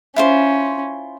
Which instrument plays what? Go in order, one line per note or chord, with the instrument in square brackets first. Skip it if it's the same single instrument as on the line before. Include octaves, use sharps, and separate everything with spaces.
[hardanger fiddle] C#4 [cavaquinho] E4 F4 C5